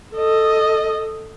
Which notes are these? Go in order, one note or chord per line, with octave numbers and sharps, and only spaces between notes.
A4 D#5